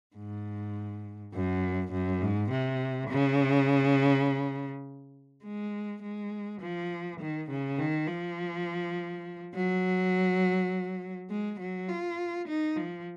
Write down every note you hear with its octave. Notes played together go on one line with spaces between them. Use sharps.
G#2
F#2
F#2
G#2
C3
C#3
G#3
G#3
F3
D#3
C#3
D#3
F3
F#3
G#3
F#3
F4
D#4
F3